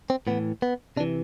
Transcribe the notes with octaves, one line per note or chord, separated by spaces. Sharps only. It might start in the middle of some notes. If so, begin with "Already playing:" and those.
C4
A2 E3 B3
B3
C3 E3 D4